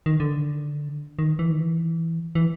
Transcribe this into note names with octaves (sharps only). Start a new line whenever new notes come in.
D#3
D3
D#3
E3
D#3
E3
E3